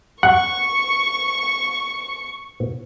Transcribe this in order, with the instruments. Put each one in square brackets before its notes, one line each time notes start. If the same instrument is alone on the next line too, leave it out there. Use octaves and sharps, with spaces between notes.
[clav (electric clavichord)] F#5 [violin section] C#6